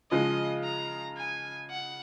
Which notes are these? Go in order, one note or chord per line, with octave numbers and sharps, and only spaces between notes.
C#3 F3 G#3 D#5
A#5
G#5
F#5